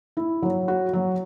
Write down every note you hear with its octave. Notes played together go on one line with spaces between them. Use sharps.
E4
F#3
F#4
F#3